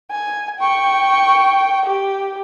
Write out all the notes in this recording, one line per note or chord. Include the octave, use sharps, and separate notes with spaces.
G#5
G5 C#6
G4